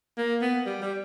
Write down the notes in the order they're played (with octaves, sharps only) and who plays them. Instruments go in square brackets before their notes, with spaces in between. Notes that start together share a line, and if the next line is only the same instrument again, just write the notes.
[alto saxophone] A#3
B3
G3
G3